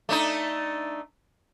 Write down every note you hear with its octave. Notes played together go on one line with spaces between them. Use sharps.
A3 D4 D#4